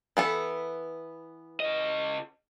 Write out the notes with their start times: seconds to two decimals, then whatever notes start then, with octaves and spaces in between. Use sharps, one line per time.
0.17 E3 B3 A4
1.60 C#3 D#5